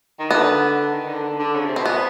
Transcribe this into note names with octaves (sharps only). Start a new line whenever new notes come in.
D#3
D3 B3
D#3
D3
D3
D3
C#3
C3
B2 C4
C3 B3